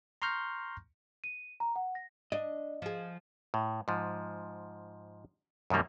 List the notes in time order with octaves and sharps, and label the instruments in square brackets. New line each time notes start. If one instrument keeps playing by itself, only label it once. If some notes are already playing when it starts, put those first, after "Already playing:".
[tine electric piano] A#5 C6 C#6 F6 G6 A#6
[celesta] D#7
A#5
F#5
A#6
[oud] D4 [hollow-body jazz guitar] D#5
[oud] F3 G#4
[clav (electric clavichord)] A2
G#2 F3
F#2 B2 D#3 G3 A#3